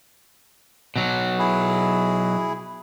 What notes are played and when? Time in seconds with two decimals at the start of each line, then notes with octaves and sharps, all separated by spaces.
0.96 B2 F#3
1.39 E4 G#4